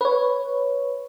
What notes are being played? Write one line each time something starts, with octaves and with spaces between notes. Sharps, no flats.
B4 C#5